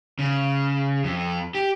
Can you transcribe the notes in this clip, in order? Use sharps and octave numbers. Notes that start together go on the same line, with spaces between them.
C#3
F2
G4